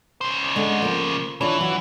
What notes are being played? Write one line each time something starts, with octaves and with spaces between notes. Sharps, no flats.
C#3 C5
D3 G#3
F3 A#3
E3 D4 F4 C#5
F#3